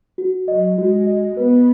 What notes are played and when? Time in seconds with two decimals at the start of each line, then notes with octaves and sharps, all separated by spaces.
0.18 F#4
0.48 F#3 D#5
0.77 G#3 F#4
1.07 D#5
1.36 B3 B4